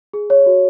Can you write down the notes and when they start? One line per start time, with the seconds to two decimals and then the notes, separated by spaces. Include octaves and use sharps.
0.13 G#4
0.30 C#5
0.46 F#4